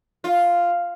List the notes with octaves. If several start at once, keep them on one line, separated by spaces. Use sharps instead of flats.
F4